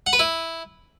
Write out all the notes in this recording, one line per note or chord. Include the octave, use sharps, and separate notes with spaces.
F#5
B4
E4